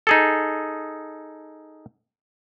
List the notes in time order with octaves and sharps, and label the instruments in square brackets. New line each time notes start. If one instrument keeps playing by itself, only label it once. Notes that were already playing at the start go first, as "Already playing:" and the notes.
[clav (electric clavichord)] D#4 G#4 A4